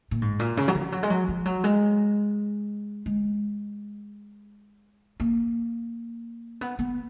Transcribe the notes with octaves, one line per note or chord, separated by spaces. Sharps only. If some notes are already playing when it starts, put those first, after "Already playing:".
A#2
G#2
A#2
C#3
F#3
F3
F#3
G#3
F#3
F3
F#3
G#3
G#3
A#3
B3
B3